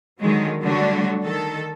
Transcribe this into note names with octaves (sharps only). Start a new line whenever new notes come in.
D3 D#3 F#3 G#3
D3 F#3 G3 A3 D4 F#4
D#3 A4